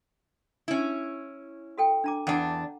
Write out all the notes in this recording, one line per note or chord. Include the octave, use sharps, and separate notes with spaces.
C#4 E4
F#4 A4 G5
D4 A#5 D6
E2 D4 F#5 A#5